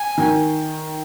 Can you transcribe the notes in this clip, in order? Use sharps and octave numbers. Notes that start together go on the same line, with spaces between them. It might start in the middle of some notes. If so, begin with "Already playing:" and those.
Already playing: G#5
D#3